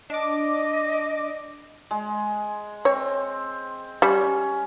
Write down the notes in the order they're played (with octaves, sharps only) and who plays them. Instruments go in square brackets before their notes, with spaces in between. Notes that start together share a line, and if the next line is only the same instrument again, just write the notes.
[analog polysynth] D4 D6 [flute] D#5
[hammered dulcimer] G#3
[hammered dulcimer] C4 [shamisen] C#5
[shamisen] G3 [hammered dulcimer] C#4